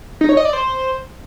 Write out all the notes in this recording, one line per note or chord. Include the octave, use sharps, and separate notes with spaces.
D#4
C#5
D#5
D5
C5